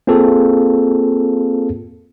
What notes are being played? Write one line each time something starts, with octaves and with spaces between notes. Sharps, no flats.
A#3 C4 F4 G#4 A4